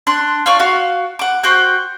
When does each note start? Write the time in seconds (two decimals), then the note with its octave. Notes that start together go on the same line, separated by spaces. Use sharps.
0.07 D4 C6 F#6
0.46 F4 D5 C#6 F6
0.59 F#4 F5
1.19 F#5 D6
1.43 F#4 C5 G5 F#6